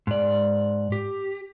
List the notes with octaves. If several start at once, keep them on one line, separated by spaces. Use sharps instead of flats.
G#2 D5
G4